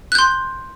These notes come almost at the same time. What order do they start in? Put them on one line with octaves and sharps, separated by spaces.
F#6 G6 C6